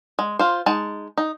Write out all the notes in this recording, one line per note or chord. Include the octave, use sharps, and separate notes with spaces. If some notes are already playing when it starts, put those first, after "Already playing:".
G#3
F4 C5
G#3 D#4 A5
D#4